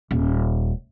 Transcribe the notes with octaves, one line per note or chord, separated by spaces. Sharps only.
D#1